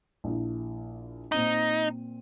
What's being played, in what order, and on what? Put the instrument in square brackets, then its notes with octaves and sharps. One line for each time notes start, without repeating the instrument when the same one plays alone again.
[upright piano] A#1 E4
[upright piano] A#2 C4 D#7 [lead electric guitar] D#4